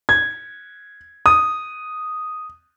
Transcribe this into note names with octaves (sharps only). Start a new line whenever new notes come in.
G#6
D#6